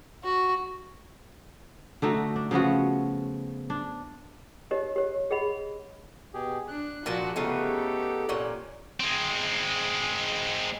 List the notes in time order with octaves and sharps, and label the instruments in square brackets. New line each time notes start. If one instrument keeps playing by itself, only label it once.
[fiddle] F#4
[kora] D3 A3 D#4 F#4
D4
C#3 F3 B3 F#4
D4
[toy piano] D#4 G4 C#5 D#5
G4 C#5
G#4 D#5 F#5 B5
[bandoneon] B2 G4 G#4
[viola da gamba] D4 [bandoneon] F#6
[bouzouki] A#2 A#4 A5 [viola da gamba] F3 F#4
[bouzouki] C#3 A3 B3 [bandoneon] D#4 A4 [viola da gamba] G4
[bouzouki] A#2 C#4 F#5
[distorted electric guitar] G#3 C4